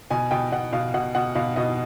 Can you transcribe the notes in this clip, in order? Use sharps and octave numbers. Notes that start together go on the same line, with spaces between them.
B2 G#5
B2 G5
B2 F#5
B2 F5
B2 F#5
B2 F#5
B2 F5
B2 D#5